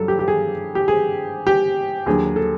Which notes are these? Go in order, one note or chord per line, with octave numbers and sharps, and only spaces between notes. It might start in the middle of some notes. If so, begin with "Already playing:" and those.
Already playing: G2 D3 F#3 A4
G4
G4
G#4
G4
G#4
G4
D#2 D3 F#3 G#4
A4